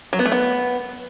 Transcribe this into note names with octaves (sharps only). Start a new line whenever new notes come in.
F#3
B3
A3
B3